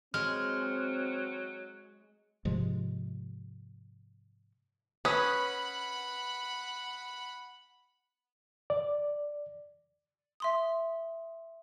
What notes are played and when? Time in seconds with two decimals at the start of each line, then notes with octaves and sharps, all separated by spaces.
0.14 F#3 G#3 C4 F6
2.45 G#2 C3 F3 G#3
5.05 C#4 B4 F#5 B5 D#6
8.70 D5
10.40 E5 C6 D#6